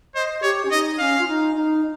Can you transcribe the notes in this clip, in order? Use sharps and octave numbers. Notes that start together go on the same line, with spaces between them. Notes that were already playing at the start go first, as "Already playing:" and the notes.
C5 D#5
G4 C#5
C#4
D#4 D#5
C#4 F5
F4
D#4
D#4